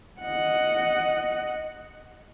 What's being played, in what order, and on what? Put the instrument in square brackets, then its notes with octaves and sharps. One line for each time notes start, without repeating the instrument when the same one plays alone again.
[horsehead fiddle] D#5 F#5